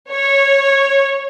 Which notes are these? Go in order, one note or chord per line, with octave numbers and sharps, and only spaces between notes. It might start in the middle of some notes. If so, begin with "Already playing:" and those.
C#5